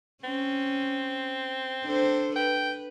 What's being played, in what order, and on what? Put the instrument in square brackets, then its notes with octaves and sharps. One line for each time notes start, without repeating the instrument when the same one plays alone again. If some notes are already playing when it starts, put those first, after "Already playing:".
[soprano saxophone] C4 [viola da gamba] C#4
[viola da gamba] D4 A4 C5
[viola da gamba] B4 [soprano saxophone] G5